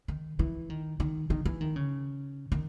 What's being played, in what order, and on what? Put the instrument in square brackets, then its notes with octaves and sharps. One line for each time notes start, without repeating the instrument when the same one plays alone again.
[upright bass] D#3
E3
D#3
D#3
D#3
E3
D#3
C#3
D#3